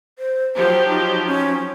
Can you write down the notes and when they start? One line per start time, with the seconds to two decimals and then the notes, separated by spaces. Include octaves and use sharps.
0.19 C5
0.55 F3 F#3 G4 C5
0.88 D#4
1.27 C#4